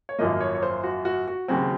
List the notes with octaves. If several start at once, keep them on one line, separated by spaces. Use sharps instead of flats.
C#5
G#1 F#2 F3 A#3 D#5
C#5
C#5
C5
F#4
F#4
F#4
D#2 C#3 F#3 C4 F#4